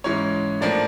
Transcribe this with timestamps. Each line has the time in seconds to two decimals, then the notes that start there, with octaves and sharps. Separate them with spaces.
0.04 G#2 E3 G#3 C#4 C#5
0.61 A2 F3 A#3 D4 D5